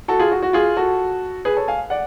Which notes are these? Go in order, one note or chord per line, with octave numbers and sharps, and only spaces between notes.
F#4 A4
F4 G#4
F#4
F#4
F4 G#4
F#4 A4
G#4 B4
A4 C#5
F5 G#5
D5 F#5